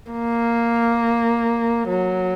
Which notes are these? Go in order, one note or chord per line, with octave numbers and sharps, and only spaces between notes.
A#3
F#3